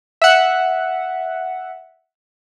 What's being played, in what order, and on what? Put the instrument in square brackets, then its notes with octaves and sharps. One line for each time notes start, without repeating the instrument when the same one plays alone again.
[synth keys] E5 F#5